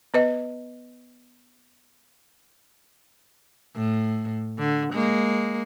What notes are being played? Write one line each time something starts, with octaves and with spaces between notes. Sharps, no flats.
B3 B4 D#5
A2
D3
G#3 A#3